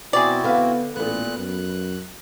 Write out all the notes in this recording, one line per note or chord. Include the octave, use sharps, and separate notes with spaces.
B2 C4 E4 F#4 G#4 D5
D3 B3 B4 F5
A1 A#2 B3 A4 F#6
F#2 F#6